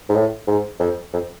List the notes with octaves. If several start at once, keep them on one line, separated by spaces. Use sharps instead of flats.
G#2
A2
G#2
F2
F2